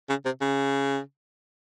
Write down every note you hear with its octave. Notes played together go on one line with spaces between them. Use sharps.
C#3
C3
C#3